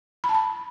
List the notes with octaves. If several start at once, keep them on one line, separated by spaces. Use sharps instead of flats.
B5
A5
B5